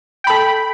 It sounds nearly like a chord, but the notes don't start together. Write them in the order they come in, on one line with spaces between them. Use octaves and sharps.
G5 B5 A4